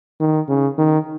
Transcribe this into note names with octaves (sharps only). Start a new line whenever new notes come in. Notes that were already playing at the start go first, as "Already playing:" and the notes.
D#3
C#3
D#3